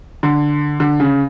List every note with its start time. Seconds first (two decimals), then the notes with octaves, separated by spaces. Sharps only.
0.23 D3
0.80 D3
1.00 C#3